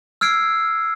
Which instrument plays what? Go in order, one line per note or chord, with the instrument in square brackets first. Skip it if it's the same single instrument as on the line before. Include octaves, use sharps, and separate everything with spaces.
[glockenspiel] E6 F6 G#6 C7 D7